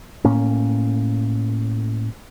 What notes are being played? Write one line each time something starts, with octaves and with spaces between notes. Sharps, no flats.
A2 A#3 C#4